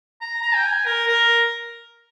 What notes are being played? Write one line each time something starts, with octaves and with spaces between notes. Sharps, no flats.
A#5
A#5
G5
G#5
A#4
A#4